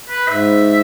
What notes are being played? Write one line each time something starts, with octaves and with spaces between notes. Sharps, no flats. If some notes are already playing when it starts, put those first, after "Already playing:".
B4
G#2 E5